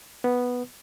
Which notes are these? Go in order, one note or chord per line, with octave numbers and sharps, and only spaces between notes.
B3